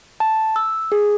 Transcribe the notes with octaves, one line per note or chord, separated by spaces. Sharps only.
A5
E6
G#4